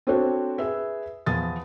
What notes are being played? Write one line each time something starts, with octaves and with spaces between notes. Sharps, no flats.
C4 D4 F#4 A4 C5 C#5
G#4 B4 E5
E2 F3 D#6 A6